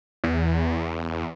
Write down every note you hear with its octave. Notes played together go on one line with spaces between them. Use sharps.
E2